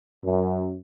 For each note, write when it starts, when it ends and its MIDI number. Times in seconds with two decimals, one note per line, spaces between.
0.24 0.75 42